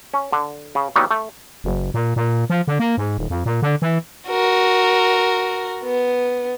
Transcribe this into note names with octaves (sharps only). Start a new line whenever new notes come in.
C#4
D3
C#3
A#2 D#3 F#3 G3 B3 D#4
A3
F#1
A#2
A#2
F3
D3
A#3
G#2
D#1
F2
A#2
D3
E3
F#4 A#4
B3